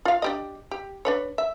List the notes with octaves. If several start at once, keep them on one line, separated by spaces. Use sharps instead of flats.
F4 F5
D4 G4 D#5
G4
D4 B4 C#5
E5